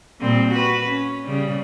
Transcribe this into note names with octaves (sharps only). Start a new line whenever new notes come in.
A#2 G3 C4
F#4 B4
C#4
C#3 G3